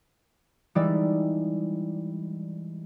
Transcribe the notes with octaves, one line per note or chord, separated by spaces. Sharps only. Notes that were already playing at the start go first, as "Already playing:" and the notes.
E3 G3 G#3 D#4 D5 E5